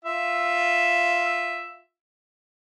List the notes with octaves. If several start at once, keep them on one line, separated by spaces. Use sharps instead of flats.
F4 E5